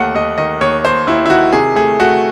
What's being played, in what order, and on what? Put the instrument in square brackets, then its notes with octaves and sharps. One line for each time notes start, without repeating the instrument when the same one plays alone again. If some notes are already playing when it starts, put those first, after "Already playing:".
Already playing: [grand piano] D#2 A3 F#5
D#2 D#5
D#3 D#5
D#2 C#5
D#2 C5
D#2 E4
E4
D#3 F#4
C3 G#4
A3 G#4
A3 F#4